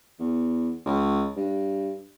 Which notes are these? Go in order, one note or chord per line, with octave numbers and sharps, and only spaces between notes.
E2
C#2
G2